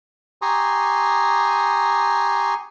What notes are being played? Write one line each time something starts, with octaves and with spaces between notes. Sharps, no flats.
G4 G#5 A#5 C6 C#6 D#6